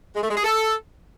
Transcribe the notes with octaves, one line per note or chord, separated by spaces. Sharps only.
G#3
A3
G#3
G#4
A4